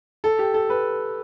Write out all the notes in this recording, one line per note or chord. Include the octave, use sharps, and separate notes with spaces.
A4
G4
A4
B4